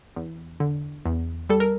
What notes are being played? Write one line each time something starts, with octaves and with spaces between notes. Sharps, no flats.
E2
D3
E2
G3 A4
A#4